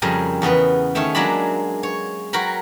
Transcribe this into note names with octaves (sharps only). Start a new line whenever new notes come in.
F2 C#3 G3 A#4 G#5
E2 C#3 B3 B4
D#3 A3 C#4 C#5 E5 G5
F#3 G#3 A#3 D4 D5 B5
C#5
F#3 F#4 A#4 G5 B5